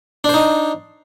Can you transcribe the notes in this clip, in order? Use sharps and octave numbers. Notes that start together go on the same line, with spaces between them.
D4 D#4 C5